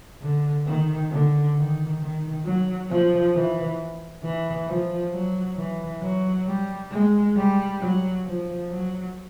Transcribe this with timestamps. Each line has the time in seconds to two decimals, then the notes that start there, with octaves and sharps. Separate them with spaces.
0.22 D3
0.66 D#3
1.11 D3
1.55 D#3
2.00 D#3
2.45 F#3
2.90 F3
3.34 E3
4.23 E3
4.68 F3
5.12 F#3
5.57 E3
6.01 F#3
6.47 G3
6.91 G#3
7.36 G3
7.81 F#3
8.25 F3
8.70 F#3